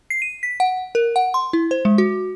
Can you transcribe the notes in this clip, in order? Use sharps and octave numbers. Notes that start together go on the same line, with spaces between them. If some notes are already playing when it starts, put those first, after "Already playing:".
C7
D#7
B6
F#5
A#4
F#5
C6
E4
C5
G#3
F#4